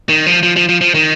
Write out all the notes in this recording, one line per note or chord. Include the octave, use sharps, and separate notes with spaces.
D#3
F3
F3
F3
F3
F3
D#3